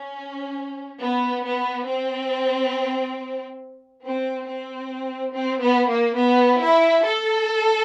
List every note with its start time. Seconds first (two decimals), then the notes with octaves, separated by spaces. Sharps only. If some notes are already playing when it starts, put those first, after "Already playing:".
Already playing: C#4
1.00 B3
1.44 B3
1.86 C4
4.03 C4
4.45 C4
5.33 C4
5.61 B3
5.90 A#3
6.18 B3
6.61 E4
7.05 A4